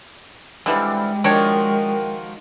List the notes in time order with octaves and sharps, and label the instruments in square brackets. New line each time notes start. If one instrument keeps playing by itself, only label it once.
[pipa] D3 E3 C4 [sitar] G3 [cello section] G#3
[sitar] D#3 F3 F#4 [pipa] D4 G4 C#5 [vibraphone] A#4 G5